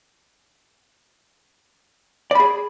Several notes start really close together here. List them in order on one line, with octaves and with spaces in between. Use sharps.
D5 B5 G#4